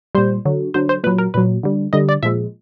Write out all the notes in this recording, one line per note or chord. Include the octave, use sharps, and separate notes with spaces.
A#2 G3 C5
D3 F#3
D3 F#3 C5
C5
A#2 F#3 B4
A#4
A#2 F#3 B4
D3 G3
D3 G3 D#5
D5
A#2 F3 G#3 E5